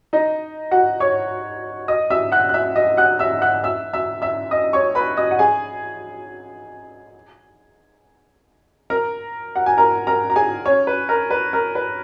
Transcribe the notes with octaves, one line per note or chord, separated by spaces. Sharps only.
D#4 D#5
F#4 F#5
C#5 C#6
D#5 D#6
E5 E6
F#5 F#6
F#6
E5 E6
D#5 D#6
F#5 F#6
E5 E6
F#5 F#6
E5 E6
E5 E6
E5 E6
D#5 D#6
C#5 C#6
B4 B5
D#5 D#6
F#5
G#4 G#5
A#4 A#5
F#5
G#5
A#4 A#5
A#4 A#5
A#5
G#4 G#5
C#4 C#5
B4
A#4
B4
A#4
B4